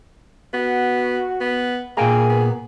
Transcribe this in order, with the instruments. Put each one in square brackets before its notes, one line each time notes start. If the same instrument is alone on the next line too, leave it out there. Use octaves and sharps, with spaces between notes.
[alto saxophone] B3 [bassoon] F#4
[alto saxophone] B3
[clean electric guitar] A#2 G5 A#5 [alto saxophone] A#3 [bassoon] G#4
[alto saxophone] B3